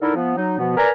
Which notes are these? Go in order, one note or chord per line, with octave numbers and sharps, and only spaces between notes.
D3 D#4 E4 A4 A#4
F3 B3
F#3 D#4
B2 F3 B3
A#4 B4 D5 G#5 A#5